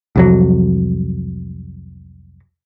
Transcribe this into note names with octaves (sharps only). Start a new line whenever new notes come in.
C2 F2 F#3